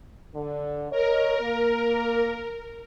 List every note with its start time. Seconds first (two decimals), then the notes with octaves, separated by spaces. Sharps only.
0.34 D3
0.91 A#4 C#5 D#5
1.40 A#3